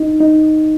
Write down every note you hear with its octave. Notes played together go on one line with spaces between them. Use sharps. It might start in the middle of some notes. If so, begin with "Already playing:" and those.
Already playing: D#4
D#4